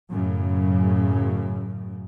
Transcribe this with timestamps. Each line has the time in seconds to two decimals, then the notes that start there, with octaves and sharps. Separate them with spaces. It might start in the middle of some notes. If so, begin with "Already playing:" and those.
0.10 F#2 A2 C#3